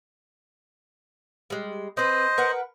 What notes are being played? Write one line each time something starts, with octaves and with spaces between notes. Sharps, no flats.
G3 G#3
C4 B4 C5 D#5
A#4 B4 F#5